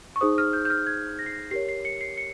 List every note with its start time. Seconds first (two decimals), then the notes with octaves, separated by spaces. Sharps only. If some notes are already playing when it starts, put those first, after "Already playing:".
0.16 C#6
0.21 D#4 G#4 C5 D#6
0.38 F6
0.53 G6
0.65 G6
0.70 F6
0.87 G#6
1.19 A#6
1.26 C7
1.33 A#6
1.51 G4 A#4 C#5 C7
1.69 C7
1.85 C#7
2.01 C7
2.17 C#7